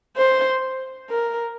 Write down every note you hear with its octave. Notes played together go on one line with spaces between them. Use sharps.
C5
A#4